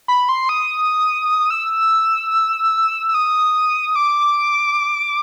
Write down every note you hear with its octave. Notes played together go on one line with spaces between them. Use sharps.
B5
C6
D#6
E6
E6
D#6
D6